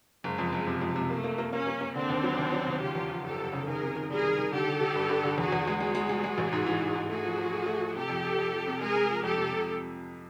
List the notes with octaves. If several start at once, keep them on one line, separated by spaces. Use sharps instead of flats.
F#1 G#3
F2
F#1
C3
F2
C3
A3 A#3
A#3
A#3
A#3 C#4
A#3
A#3
D3 C4 D4
D#2
F#3
D#2
F#3
D#2
C#3 F4 G4
E2
F3
F#1 G4 A4
F#1
C#3
D#3 G#4 A#4
C3
D#3
G3 G#4 A#4
D#3
D#3
D3 G4 A4
D3
D3
G2
G2
D3
E2 F#4 G#4
E2
G#3
G#3 F#4 G#4
G#3
G#3
G#3
A1
G#2
E3
G#2
G#2
A3 F#4 G#4
F3
F3
A3
A3
F3
C3 G4 A4
F2
F2
F2
F3
C3
G#3 G#4 A#4
G#3
F3
F2 G4 A4
C3
C3